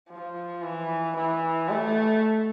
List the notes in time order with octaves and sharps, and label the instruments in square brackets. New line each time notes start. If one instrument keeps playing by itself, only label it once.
[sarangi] F3
E3
E3
A3